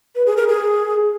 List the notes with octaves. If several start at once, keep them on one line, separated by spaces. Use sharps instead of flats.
B4
G#4
A#4
G#4